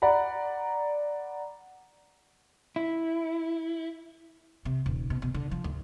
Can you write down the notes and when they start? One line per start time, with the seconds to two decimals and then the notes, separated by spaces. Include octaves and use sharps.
0.02 D5 F#5 A#5 B5
2.76 E4
4.65 C3
4.86 D#1
5.10 B2
5.22 B2
5.34 D3
5.51 F3
5.64 D2